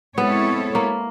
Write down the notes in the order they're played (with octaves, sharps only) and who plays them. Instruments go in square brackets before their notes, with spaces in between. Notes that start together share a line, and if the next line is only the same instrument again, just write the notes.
[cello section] G#3 C4 E4 A4 C#5 [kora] B3
[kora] A#3